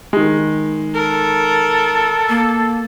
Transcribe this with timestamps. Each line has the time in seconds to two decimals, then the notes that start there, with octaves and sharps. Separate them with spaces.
0.13 D#3 G#3
0.94 A4 A#4
2.29 A#3